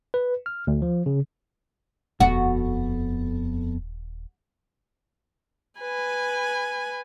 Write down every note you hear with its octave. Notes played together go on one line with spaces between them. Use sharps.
B4
F6
D2
F3
C#3
D#1 F2 B3 F#4 A4
B4 G#5